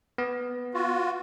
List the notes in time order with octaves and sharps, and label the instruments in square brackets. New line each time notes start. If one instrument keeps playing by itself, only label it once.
[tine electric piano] B3
[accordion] F4 F#4